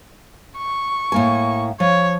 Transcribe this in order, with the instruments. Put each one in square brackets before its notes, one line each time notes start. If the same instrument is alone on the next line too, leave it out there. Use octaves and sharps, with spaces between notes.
[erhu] C#6
[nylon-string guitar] A2 A#3 G#5
[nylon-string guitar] F3 [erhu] C#5